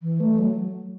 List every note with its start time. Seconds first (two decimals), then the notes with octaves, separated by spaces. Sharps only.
0.02 E3
0.20 A3
0.39 F#3